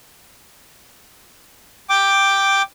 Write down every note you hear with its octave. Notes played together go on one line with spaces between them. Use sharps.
G5 D6